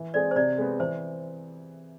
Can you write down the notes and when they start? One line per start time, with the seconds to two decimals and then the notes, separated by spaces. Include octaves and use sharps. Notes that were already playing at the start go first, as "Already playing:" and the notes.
Already playing: E3
0.14 G#3 C4 G#4 D5
0.31 C5
0.36 C3 D5
0.58 G#3 B3
0.80 E3 C5